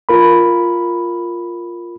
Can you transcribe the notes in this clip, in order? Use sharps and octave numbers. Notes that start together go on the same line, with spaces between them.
F4 A#4 B5